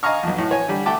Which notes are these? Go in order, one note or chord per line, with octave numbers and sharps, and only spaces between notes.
D#5 F5 G#5 A#5 C#6 F6
B1 F2
A2
C#5 G#5
D3 G3
A3 F#5 G5 A5 D6